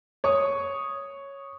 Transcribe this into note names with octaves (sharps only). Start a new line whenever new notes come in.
C#5 C#6 D#6